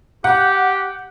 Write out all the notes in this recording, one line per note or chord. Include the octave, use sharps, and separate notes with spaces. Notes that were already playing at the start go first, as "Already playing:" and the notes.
G4 F#5